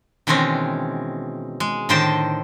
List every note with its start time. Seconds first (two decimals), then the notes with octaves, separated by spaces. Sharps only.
0.27 B2 D#3 E3 G#3 C4 C#4
1.60 G#3
1.89 A2 D3 D#3 C5 G5 A5